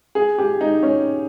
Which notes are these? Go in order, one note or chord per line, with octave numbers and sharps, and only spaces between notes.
G#4
G4
D#4
C#4